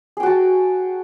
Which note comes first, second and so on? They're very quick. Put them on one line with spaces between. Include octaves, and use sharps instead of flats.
G#4 G5 F#4 A5